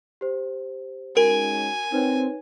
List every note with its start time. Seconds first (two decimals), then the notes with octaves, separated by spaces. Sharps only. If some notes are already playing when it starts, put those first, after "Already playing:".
0.21 G4 C5
1.17 G#3 C#4 D#4 F#4 A#4 G#5
1.92 C4 D#4 B4 C#5